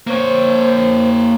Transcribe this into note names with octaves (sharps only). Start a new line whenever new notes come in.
A#3 C5 C#5